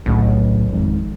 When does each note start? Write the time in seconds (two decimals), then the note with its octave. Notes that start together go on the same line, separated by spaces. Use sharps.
0.06 D1 B1 A2 C#3
0.73 G#1 F2 G#2